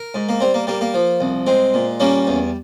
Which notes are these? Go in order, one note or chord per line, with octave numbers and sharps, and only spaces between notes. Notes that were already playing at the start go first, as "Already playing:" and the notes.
Already playing: A#4
G#2
A#3
G3 C4
A#3
G3 A#3
A#3
F3
C2
G#3 C4
A#2
G3 A#3 C#4
E2